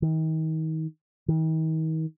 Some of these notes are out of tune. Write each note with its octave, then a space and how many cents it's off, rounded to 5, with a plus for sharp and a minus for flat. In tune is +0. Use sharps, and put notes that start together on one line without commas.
D#3 +35
D#3 +40